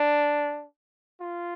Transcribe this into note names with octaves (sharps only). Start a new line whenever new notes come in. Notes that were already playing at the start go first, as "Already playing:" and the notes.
Already playing: D4
F4